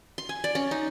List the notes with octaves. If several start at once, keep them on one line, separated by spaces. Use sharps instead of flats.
C6
G#5
D5
C#4
D#4